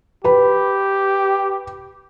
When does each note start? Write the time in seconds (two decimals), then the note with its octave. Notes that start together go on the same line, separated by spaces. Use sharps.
0.24 G4 B4 B5